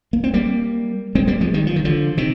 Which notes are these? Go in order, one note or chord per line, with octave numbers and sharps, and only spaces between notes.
A#3
C4
G3 A#3
G#3 C4
G3 A#3
F3 G#3
D#3 G3
F3
D#3
D3 F3
C3 D#3